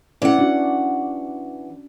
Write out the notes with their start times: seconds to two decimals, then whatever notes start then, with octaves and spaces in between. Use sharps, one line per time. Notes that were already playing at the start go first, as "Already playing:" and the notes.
0.22 E3 C#4 D5 F#5
0.39 D4 F#4